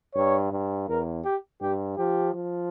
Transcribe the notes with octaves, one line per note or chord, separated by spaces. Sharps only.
G2 C#5
G2
E2 A#4
G4
G2 G4
F3 G4
F3